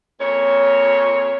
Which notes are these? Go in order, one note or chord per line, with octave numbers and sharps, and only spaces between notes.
F2 A#2 C#5